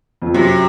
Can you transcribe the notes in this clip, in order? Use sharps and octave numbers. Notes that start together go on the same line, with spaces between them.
F2
F#2 C3